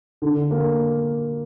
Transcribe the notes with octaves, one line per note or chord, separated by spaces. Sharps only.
D3
A#3